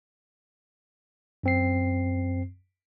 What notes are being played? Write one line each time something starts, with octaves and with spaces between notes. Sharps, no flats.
F#2 C4 C7